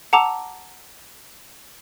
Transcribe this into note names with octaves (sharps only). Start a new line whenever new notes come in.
F#5 A5 A#5 D6 E6 F7